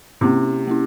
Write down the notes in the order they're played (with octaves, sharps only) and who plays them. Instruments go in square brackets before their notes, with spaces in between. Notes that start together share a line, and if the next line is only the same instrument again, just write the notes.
[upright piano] C3 [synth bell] A#3 C#4 E4
[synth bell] A#3 C#4 E4